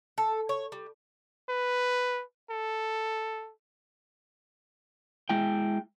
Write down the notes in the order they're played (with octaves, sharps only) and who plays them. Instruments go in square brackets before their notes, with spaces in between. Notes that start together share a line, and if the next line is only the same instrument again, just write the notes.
[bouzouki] A4
C#5
G3
[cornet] B4
A4
[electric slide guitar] G#3 E4 G5